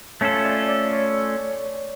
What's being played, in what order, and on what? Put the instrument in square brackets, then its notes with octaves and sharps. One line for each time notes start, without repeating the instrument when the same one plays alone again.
[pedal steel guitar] A3 C#4 F4 A4 [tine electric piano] C#5
[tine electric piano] D5
D5
C#5